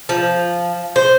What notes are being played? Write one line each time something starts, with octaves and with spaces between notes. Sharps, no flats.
F3
C5